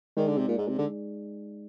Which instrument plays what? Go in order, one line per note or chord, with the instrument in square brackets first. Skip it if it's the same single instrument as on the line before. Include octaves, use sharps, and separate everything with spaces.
[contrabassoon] D#3 [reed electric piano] G#3 D#4 G#4 D5
[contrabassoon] D3
C3
A#2
G#2
C3
D3